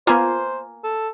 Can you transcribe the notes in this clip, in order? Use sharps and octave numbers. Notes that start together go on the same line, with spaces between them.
A#3 B3 F4 A#4 C5 G#5
A4